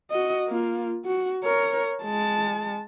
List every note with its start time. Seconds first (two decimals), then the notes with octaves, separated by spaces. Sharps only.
0.10 F#4 D#5
0.48 A#3 F4
1.05 F#4
1.44 A#4 C#5
2.04 G#3 A5